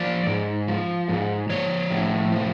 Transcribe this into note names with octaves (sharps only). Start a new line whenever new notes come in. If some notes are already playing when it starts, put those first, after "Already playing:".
Already playing: F3 D5
G#2
F3
G#2
F3 C#5
A2
F3